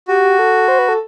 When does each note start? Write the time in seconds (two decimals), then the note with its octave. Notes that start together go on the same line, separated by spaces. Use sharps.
0.08 F#4 G4
0.39 A4
0.68 C5
0.79 B4
0.89 A4